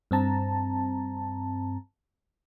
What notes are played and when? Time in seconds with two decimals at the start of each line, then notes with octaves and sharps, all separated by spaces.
0.11 G2 C4 A5 A#5